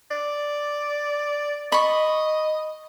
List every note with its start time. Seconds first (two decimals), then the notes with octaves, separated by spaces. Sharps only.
0.11 D5
1.72 D#5 B5 C#6